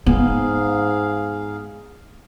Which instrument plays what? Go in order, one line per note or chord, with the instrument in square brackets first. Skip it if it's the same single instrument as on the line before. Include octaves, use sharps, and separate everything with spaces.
[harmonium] G#2 G#4 F5 [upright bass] B3